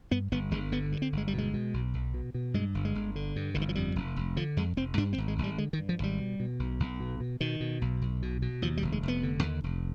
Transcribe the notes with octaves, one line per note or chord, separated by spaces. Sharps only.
G2 B3
G1 B3
G1 G#3
D3 B3
G2
C4
G1
G#3
G3
B2
G#3
B2
B1
B1
B2
B2
G2 G#3
G1
G#3
G1
D3
G2
G1 D3
D#3
F3
F2 G3
F1
F1
D3 F3
F2 G#3
F1 C4
G2 D4
C4
G#1
G#3
G#1
G3
D3 G#3
D#3
G2
F3
G#1 G3
B2
B2
B1
B1
B2
B2
B2 D#3
B2
B1
B1
B2
B2
D#2 F3
G3
F1
G#3
F1
B3
D3
D#2
F1